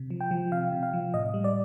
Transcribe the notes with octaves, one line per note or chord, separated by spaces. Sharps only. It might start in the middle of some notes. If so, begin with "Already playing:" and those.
Already playing: C3
F3
G5
F3
C3 F5
C3
F5
F3
A2 D#5
G3
D5